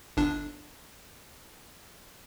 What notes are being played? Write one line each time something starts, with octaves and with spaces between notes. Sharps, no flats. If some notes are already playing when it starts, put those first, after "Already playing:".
G1 D4